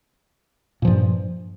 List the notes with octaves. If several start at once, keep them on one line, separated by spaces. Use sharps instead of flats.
G2 A#2 F3